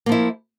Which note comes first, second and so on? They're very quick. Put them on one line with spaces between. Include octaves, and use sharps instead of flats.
A#3 F3 E4